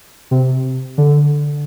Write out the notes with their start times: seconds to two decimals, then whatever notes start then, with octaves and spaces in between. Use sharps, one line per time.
0.31 C3
0.98 D3